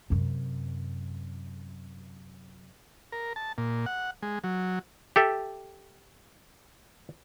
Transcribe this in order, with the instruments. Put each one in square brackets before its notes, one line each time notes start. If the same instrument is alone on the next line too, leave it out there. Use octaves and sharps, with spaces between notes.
[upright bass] F#2 C3
[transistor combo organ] A#4
A5
A#2
F#5
G#3
F#3
[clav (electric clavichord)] G4 A4 E5